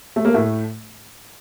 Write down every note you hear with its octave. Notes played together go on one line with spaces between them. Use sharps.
A3
A#3
A2 A3